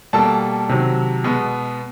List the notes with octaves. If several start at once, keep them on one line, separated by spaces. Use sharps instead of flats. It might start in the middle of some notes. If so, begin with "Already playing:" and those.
B2 G3 A#3 A4 A5
C3 D#3 F#3
B2 G#3 B3